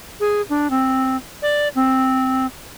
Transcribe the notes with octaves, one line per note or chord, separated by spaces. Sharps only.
G#4
D4
C4
D5
C4